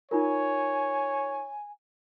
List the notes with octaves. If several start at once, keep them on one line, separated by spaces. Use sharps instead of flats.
D#4 F4 A#4 C#5 G#5